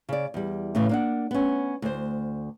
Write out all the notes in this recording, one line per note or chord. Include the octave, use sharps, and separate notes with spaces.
C#3 D5
E2 G3
A2 C#3 E3
A#3 D4 F#5
B3 C#4
D2 C5